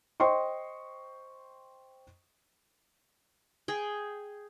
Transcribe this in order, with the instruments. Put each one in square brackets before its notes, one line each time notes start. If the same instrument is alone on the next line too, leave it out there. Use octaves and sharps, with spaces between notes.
[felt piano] C5 D#5 G5 C6 C#6
[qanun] G#4 G5